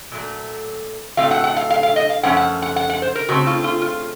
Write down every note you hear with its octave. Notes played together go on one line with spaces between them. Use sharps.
A#2 F#3 A3
A2 F#3 A3 C4 F5
F#5
F#5
F5
F5
F5
D#5
F5
F#2 F3 A3 C#4 F#5
F#5
F#5
F#5
F#5
C5
A#4
C#3 A3 C4 F#4
F4
F4
F4